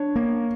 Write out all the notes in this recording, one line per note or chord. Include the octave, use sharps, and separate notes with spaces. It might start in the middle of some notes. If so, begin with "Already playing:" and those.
Already playing: D4 C#5
A#3